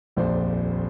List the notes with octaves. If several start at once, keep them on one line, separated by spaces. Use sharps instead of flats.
D#1 A#1 F2 C5 D5